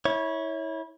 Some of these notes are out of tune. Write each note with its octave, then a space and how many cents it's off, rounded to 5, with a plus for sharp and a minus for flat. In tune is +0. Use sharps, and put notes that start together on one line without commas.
E4 -25 C#5 +0